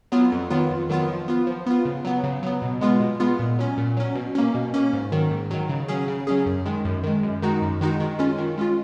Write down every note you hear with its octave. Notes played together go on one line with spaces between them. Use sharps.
F#3 B3 F4
F2
D#3 F#3 B3 F4
F2
D#3 F#3 B3 F4
F3
B3 F4
F3
B3 F4
C#3
F#3 B3
C#3
F#3 B3
B2
G#3 B3 F4
B2
G#3 B3 F4
A#2
F#3 C#4
A#2
F#3 C#4
B2
A#3 C#4
B2
A#3 C#4
G#2
D#3 F#3
G#2
D#3 F#3
C#3
F#3 C#4 G#4
C#3
F#3 C#4 G#4
F#2
D#3 G#3
F#2
D#3 G#3
F#2
D#3 G#3 D#4 F#4
F#2
D#3 G#3 D#4 F#4
D#3
G#3 C#4 F4
D#3
G#3 C#4 F4